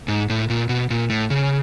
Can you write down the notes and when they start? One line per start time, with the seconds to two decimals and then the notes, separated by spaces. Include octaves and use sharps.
0.08 G#2
0.30 A2
0.50 A#2
0.69 B2
0.90 A#2
1.10 A2
1.30 C#3